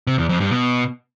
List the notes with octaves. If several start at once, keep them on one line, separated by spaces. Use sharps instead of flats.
C3
E2
F2
G2
B2